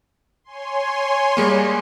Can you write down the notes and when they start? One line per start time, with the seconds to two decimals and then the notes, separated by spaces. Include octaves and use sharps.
0.44 C#5 G#5 C6
1.37 G3 G#3 A#3